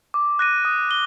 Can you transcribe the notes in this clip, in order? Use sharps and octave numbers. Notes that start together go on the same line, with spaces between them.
D6
F#6 A#6 D#7
D#6
G7